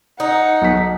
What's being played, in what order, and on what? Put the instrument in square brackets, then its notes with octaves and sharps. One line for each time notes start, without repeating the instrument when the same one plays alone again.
[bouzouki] D#4 [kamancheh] F#5
[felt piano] B1 B6